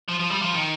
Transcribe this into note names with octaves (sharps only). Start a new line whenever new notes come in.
F3
F3
G3
F3
D#3